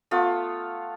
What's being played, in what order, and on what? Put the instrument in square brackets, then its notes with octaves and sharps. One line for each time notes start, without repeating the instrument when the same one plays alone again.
[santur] A3 B3 F4